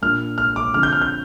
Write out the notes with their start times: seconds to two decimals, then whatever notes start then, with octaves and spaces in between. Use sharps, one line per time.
0.02 A#2 A#3 D4 F6
0.38 F6
0.56 D6
0.74 D3 F3 C4 F6
0.83 G6
0.93 F6
1.01 G6